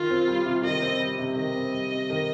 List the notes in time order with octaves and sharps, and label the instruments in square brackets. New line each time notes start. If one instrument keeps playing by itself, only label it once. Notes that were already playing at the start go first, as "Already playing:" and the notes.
Already playing: [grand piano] D#3 [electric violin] F4
[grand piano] C4
G3
C3
[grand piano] D#3 [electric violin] D#5
[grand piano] C4
G3
C3
[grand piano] D#3 [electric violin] D#5
[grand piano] C4
G3
C3
D#3